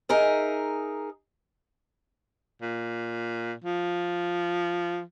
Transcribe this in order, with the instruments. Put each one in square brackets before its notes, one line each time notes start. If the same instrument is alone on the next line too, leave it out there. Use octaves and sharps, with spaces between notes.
[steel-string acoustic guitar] D#4 G#4 A#4 E5
[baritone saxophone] A#2
F3